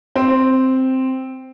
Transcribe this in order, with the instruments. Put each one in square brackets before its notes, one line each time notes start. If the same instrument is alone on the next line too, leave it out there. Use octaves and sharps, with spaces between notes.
[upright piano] C4